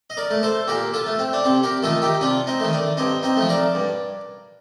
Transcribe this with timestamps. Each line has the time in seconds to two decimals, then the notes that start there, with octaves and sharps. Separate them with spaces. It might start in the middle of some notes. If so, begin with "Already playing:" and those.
0.10 D#5
0.17 A#4 D5
0.31 A3
0.43 A4 C5
0.68 A#2 G4 A#4
0.94 F4 A4
1.06 A3
1.19 C4
1.33 D4
1.44 C3 C4
1.63 G4 A#4
1.83 D#3 A3 F4 A4
2.02 D#4 G4
2.21 C3 D4 F4
2.47 C4 D#4
2.60 D#3 A3
2.73 D4
2.97 G2 C4 D#4
3.23 C4 D#4
3.37 F3 A3
3.49 A#4 D5
3.75 G2